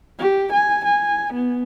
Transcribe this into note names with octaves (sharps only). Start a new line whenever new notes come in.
G4
G#5
G#5
B3